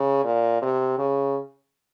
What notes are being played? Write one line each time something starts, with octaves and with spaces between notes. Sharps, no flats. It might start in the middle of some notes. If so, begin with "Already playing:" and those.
Already playing: C#3
A#2
C3
C#3